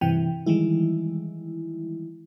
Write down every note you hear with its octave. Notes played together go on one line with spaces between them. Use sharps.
G2 C3 E3 G5
D#3 E3 G3 G#3 E4